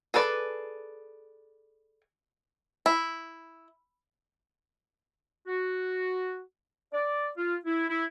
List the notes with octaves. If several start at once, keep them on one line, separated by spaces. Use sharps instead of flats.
G#4 A4 B4 D5
E4
F#4
D5
F4
E4
E4